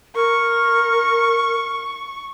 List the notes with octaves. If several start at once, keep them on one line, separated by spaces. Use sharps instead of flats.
A#4 C#6